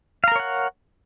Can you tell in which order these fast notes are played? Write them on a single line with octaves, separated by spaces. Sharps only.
F5 A#5 A#4 C#5 F#5